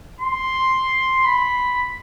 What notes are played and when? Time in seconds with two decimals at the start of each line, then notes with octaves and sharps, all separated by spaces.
0.21 C6
1.25 B5